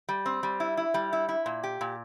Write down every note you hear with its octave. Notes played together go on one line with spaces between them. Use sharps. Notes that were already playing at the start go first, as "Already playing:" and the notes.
G3
C4
G3
E4
E4
G3
E4
E4
A#2
G4
A#2